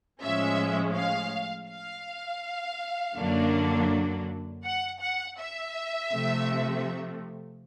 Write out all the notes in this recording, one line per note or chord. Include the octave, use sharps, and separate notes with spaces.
A2 F3 G#3 C#4 E5
F5
F5
F#2 D3 F#3 A#3 D4
F#5
F#5
E5
C3 F3 A3